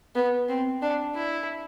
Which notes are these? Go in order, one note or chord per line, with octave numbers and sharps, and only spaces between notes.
B3
C4
D4
E4